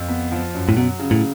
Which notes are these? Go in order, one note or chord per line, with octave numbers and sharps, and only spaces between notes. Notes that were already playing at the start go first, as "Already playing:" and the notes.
Already playing: F2
B3
F3
F#2
A2
B2 F#3
C#3
A2